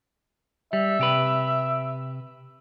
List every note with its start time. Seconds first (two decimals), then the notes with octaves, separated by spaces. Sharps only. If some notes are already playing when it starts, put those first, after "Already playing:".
0.73 G3 E5
0.99 C3 G4 B4